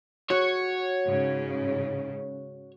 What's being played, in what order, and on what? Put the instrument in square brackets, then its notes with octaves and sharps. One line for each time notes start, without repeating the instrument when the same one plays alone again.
[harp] F#4 [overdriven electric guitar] C#5
[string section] G#2 C#3